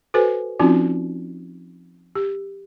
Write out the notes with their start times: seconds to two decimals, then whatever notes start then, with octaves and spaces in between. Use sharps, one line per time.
0.14 F#4 A4 B4 C5 G#5
0.59 F3 C4 C#4 D#4 F4 F#4
2.15 G4